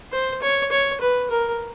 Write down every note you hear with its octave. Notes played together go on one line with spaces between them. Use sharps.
C5
C#5
C#5
B4
A#4